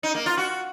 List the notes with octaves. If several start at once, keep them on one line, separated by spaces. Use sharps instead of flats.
D#4
A#3
F4
F#4